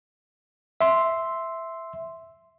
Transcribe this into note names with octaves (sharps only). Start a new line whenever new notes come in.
E5 C6